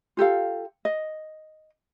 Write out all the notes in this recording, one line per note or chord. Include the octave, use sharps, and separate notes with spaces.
F4 G4 A4 F5
D#5